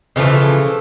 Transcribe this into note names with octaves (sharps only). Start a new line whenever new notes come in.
C#3 E3 F3 A3